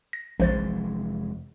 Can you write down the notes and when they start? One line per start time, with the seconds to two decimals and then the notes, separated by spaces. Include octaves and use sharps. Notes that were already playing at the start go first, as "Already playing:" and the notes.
0.13 A#6
0.40 F1 A#1 E3 G#3 C5 A6